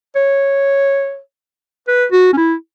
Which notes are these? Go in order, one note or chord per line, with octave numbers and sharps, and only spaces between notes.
C#5
B4
F#4
C#4
E4